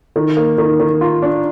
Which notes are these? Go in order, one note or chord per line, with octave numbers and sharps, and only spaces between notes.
D#3
A#3
D#3
D#3
F4
D4